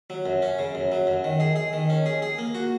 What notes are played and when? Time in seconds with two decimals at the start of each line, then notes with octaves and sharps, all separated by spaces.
0.10 F#3
0.26 F#2
0.42 C#4
0.59 C#3
0.75 F#2
0.92 F#3
1.07 F#2
1.24 D#3
1.40 G#4
1.56 G#4
1.73 D#3
1.90 C#4
2.06 G#4
2.22 G#4
2.39 A#3
2.55 F#4